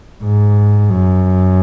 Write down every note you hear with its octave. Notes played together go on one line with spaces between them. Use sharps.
G#2
F#2